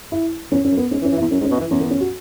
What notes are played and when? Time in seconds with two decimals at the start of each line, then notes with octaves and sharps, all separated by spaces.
0.12 E4
0.51 E2 C#4
0.65 C#4
0.71 F#2
0.77 B3
0.91 G#2 C#4
1.02 E3
1.05 C#4
1.12 E3
1.17 E4
1.22 E2
1.31 F#2 C#4
1.41 G#2
1.45 C#4
1.51 B2
1.57 E4
1.60 E3
1.71 E2 C#4
1.81 B3
1.91 C#4
2.00 F#4